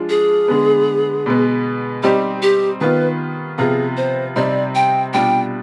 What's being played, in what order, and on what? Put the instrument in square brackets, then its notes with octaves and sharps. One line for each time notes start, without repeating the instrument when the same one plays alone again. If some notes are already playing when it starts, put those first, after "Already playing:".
Already playing: [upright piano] F3 G#3 D4 F4
[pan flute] G#4
[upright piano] D3 G#3 B3
B2 G#3 B3
[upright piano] G3 C4 D#4 [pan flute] G4
[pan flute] G4
[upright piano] D#3 B3 F4 [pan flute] B4
[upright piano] C3 F3 B3 F4 [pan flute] G#4
[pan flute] C5
[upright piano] C3 G3 C4 D#4 [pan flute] D5
[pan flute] G5
[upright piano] B2 G3 D4 F4 [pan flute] G5